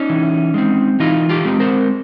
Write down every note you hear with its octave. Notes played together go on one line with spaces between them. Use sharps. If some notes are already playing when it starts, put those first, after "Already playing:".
Already playing: C#4 D#4
E3
G#3 C4
E3 D#4 F4
F4 G4
G#3 C4
A#4 C5